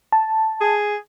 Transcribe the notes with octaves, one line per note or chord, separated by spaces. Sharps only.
A5
G#4